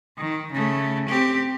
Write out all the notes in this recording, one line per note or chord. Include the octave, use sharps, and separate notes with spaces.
D#3
C#3 A3
C4 G4